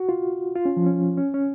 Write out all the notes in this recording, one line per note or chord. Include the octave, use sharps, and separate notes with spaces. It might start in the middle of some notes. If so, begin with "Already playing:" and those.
Already playing: F#4
F4
F4
C#4
F3
C#4
C#4
C#4